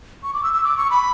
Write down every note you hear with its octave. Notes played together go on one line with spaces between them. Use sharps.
C#6
D6
E6
E6
D6
C#6
B5